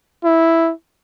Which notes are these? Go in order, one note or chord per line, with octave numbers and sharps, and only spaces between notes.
E4